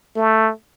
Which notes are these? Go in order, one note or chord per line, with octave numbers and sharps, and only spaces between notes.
A3